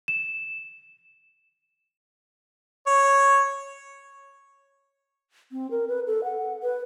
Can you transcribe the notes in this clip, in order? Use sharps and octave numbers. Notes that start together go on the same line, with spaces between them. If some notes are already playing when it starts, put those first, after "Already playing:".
E7
C#5
C4
A#4
B4
A4
F#5
B4